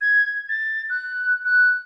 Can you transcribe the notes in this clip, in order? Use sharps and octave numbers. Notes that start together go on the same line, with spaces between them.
G#6
A6
F#6
F#6